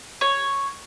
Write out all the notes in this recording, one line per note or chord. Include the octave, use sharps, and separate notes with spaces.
C#5